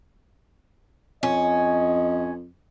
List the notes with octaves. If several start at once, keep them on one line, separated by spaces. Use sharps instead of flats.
F2 C#4 D#5